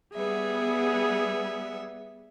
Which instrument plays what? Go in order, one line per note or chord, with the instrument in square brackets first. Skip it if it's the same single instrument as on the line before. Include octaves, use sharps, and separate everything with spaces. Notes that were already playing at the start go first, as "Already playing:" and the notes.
[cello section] G3 B3 [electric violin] G#4 [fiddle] E5